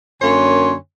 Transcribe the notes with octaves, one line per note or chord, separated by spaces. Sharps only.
F#2 D3 A#3 C#5 G#5 C6